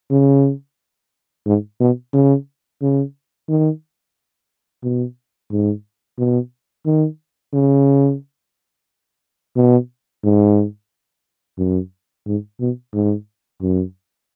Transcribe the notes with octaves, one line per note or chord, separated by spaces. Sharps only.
C#3
G#2
B2
C#3
C#3
D#3
B2
G#2
B2
D#3
C#3
B2
G#2
F#2
G#2
B2
G#2
F#2